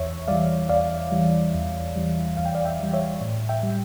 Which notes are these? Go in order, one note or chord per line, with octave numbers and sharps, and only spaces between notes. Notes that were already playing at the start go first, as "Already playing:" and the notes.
Already playing: E2 C#5 E5
E3 G3 D5 F5
E2 D5 F5
E3 G3
E2
E3 G3
E2 F5
G5
D5 F5
E5 G5
E3 G3
C#5 E5
A2
E5 G5
G3